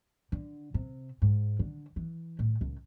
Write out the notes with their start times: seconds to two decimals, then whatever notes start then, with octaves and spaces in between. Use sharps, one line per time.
0.32 D3
0.74 C3
1.22 G#2
1.59 D3
1.96 E3
2.39 A2
2.61 C#2